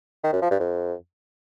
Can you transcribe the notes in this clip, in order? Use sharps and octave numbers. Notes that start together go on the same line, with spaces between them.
D#3
F#2
F3
G2
F2